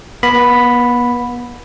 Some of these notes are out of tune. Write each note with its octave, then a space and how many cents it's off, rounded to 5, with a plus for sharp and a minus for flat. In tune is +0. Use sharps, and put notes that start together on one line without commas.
B3 -35 B5 +0